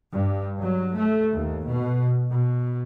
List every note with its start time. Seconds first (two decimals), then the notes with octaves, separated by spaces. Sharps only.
0.11 G2
0.58 F#3
0.94 A3
1.34 D#2
1.69 B2
2.29 B2